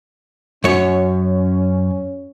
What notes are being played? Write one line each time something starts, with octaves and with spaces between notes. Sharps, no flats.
F#2 C#4 C#5